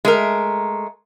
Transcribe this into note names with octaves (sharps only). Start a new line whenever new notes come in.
G#3 A3 A#4